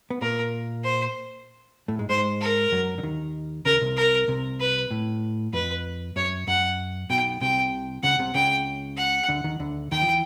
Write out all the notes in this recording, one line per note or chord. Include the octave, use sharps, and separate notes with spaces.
B3
A#2 A#3 A#4
C5
A2 A3
G#2 G#3
G#2 G#3 C5
A#4
F#2 F#3
D3
D#2 D#3
C#2 C#3 A#4
C2 C3
A#4
C2 C3
B4
A2
F2 B4
F#2 C#5
F#2 F#5
B1 B2 G5
C2 C3 G5
C#2 C#3 F#5
C2 C3
C#2 C#3 G5
F#5
D2 D3
D#2 D#3
D2 D3
D#2 D#3 G5
F3
E3